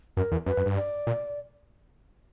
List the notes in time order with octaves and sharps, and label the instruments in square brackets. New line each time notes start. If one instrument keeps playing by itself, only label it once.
[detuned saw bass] F#2 [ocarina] A#4
[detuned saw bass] E2
[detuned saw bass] F#2 [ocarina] B4
[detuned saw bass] F#2
G2
[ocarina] D5
[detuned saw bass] A#2